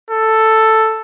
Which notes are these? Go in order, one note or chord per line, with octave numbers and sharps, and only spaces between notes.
A4